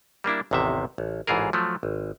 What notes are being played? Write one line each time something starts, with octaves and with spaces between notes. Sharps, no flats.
G3 A#3 D4 E4
A1 E2 C3 D#3 E5
A1
A1 G#2 E3 F4 G#4 A#4
F3 F#3 A3
G#1